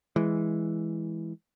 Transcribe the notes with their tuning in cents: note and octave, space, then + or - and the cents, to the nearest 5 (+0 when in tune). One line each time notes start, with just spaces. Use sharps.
E3 +0 G#3 +0